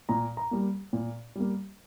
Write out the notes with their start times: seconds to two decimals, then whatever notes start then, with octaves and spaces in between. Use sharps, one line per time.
0.09 A#2 A#5
0.37 A#5
0.51 G3 A#3
0.93 A#2
1.36 G3 A#3